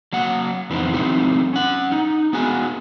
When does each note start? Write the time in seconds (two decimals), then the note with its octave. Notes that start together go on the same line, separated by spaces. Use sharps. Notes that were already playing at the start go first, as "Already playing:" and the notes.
0.13 F#3 A#3 F#5
0.70 F2 E3 B3 C4 D#4
0.94 E3 F#3 A3 C4 D#4 G4
1.53 C#4 F#5
1.92 D#4
2.33 B3 F#4 G#4 G#5